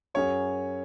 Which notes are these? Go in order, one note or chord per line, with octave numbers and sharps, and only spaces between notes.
F#2 F#3 C#4 G#4 C#5